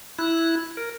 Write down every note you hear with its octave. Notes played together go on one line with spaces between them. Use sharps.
E4 F#6
A#4